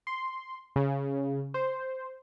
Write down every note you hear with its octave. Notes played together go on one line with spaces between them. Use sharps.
C6
C#3
C5